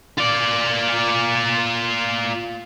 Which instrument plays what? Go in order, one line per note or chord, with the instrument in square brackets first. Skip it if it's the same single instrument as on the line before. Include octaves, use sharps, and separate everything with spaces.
[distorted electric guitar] F4 D5